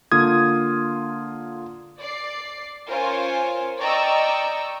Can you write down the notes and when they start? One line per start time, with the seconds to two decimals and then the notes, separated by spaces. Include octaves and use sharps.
0.12 D3 A#3 F4 D#6 G#6
2.00 D5 C7
2.87 C#4 F4 A#4 C5 C#5 G#5
3.81 D5 D#5 G5 A#5 C#6 E6